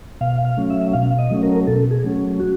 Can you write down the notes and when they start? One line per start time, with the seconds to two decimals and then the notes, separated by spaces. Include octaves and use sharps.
0.21 B2 F5
0.45 F5
0.57 F#3 A3 C#4
0.70 E5
0.93 B2 F5
1.19 D#5
1.30 F#3 A3 C#4
1.43 A#4
1.67 B2 A4
1.91 G#4
2.04 F#3 A3 C#4
2.40 F#4